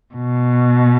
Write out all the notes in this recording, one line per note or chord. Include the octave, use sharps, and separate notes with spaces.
B2